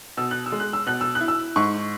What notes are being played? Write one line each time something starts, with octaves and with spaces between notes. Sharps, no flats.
B2 E6
F#6
E6
G#3
F#6
E6
B2 F#6
E6
F#6
E4
E6
G#2 C#6